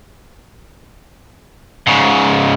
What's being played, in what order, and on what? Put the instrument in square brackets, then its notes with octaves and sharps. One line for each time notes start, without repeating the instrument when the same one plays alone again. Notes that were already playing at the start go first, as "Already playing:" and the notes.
[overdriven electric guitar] G#2 C#3